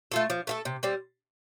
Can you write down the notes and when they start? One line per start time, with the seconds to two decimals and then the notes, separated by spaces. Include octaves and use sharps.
0.12 A3 F4 A4
0.30 F3
0.47 A3 F4 A4
0.65 C3
0.83 G3 C4